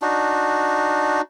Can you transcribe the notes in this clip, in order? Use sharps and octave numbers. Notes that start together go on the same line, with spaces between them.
D4 D#4 F#4